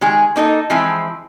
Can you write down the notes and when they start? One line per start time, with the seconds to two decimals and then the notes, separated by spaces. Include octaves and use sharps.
0.01 D#3 G#3 G#4
0.36 A#3 D#4 A4 D#5
0.70 E3 F3 G#3 C4 E4